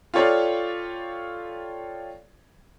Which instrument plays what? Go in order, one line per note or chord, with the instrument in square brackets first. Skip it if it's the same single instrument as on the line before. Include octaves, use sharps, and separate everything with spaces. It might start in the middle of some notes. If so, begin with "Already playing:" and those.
[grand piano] F4 G4 A4 C#5 D5 F5